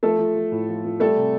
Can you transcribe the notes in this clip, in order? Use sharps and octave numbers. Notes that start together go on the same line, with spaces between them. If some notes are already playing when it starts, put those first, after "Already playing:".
F3 A3 A4
F3
F3
A2
F3
F3
G3 A3 A4
C3